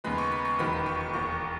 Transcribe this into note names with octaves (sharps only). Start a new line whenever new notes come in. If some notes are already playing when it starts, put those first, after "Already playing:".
D#2 C#3 G#3 B3 B5
C#6
B5
C#6
E1 D#2 D#3 F#3 B3 B5
B5
C#6
C#6
E1 D#2 D#3 C#6